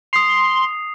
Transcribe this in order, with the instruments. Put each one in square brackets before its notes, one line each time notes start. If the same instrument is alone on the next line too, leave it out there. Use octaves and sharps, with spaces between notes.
[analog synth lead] C6 [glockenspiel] D#6 C7 F7